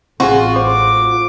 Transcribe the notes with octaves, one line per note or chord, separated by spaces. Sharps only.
A1 C4 F4 F#4 G#4
C5 D6